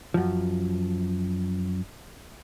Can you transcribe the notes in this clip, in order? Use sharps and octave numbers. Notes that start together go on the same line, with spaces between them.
F#2 F3